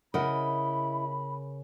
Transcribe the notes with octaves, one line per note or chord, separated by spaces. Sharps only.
C#3 E4 A#4 D#5 F#5 B5